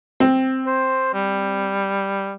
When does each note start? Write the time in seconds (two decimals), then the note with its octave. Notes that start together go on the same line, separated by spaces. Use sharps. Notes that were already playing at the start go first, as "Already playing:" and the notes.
0.20 C4
0.66 C5
1.14 G3